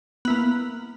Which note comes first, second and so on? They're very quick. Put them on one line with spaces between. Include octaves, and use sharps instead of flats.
B3 E4 A#3